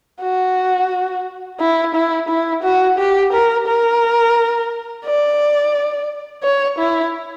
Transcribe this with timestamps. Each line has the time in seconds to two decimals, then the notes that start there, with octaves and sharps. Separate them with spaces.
0.22 F#4
1.60 E4
1.95 E4
2.29 E4
2.63 F#4
2.98 G4
3.32 A#4
3.66 A#4
5.05 D5
6.43 C#5
6.79 E4